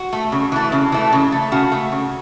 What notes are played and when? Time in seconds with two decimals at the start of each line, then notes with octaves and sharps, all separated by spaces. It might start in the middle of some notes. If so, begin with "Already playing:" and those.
Already playing: F#4
0.13 A3
0.32 C#3
0.52 E3 A3
0.72 C#3
0.92 E3 A3
1.13 C#3
1.32 A3
1.52 C#3 F#4
1.72 A3
1.92 C#3